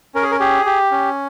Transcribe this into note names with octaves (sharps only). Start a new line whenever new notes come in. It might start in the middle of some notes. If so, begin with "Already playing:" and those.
C#4 A#4
G#4
A#4
G4 G#4
G4
C#4